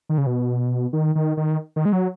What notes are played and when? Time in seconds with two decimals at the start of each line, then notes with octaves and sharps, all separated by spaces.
0.09 D#3
0.18 C#3
0.27 B2
0.93 D#3
1.15 D#3
1.37 D#3
1.76 D#3
1.85 G#3
1.93 F#3